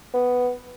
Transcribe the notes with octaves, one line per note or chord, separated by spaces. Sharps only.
B3